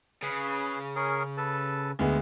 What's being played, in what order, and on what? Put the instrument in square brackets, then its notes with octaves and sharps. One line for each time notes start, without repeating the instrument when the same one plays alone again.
[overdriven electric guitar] C#3 [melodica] G#4 B4
[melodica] C#4 G#4 A#4
A4 B4 A5
[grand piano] D2 G#3 B3